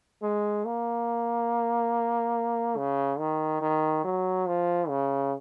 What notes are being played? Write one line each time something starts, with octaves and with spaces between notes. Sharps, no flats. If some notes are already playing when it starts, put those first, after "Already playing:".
G#3
A#3
C#3
D#3
D#3
F#3
F3
C#3